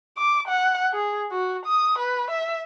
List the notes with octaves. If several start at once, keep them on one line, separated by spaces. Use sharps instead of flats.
D6
F#5
G#4
F#4
D#6
B4
E5